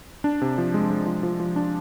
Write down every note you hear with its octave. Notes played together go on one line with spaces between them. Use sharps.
D4
C3
F3
G#3
G#3
F3
F3
F3
D4